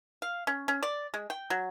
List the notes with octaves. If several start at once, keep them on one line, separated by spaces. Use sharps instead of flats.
F5
C#4
C#4
D5
G#3
G5
F#3